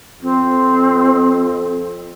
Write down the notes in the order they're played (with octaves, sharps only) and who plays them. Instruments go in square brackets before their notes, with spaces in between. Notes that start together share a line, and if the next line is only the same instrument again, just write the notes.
[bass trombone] F2 [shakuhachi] C4